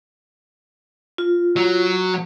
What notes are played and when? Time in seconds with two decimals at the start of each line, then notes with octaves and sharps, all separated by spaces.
1.18 F4
1.56 F#3